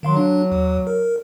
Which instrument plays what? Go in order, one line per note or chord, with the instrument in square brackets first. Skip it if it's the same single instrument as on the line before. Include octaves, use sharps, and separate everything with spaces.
[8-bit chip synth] D#3 F5 C6 [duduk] F#3
[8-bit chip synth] D4
D#2
A#4